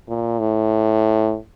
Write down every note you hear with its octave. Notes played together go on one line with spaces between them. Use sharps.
A#2
A2